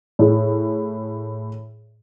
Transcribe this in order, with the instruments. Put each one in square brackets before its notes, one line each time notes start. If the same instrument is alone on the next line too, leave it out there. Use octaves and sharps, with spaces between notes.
[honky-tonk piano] A2 G#4